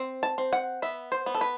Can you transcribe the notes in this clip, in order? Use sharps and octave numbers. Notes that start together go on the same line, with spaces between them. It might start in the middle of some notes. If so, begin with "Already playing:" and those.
Already playing: C4
A5
C4
F#5
B3 E5
C5
B3
A4
B4